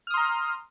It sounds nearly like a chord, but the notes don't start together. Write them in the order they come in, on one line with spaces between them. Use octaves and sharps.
F6 D#6 C6 A#5